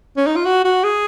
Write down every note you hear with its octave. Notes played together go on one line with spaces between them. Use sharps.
C#4
D#4
F4
F#4
F#4
G#4